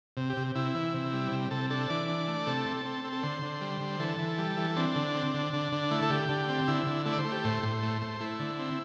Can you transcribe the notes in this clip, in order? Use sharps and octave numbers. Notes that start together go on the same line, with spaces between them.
C3
G4
C3
C3 E4
E3
C3
G3
C3
C3 A4
D4 A4
E3 D5
D4
A3
C3 A4
C4
C4
C4
A4
D3 C5
D3
G3
D3
E3 A4
E3
G3
E3
C4 D4
D3
C4
D3
D3
D3
A3 E4
A4
D3 G4
D3
C4
D3 E4
D3
A3 E4
D5
C5
A3
G4
A2 C5
A2
A3
A3
A3 E4
D3
C4